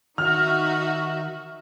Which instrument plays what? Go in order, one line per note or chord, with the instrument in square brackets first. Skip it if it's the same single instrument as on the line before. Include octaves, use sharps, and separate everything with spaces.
[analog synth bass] D#3 [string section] D#4 F#4 E5 [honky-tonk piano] F6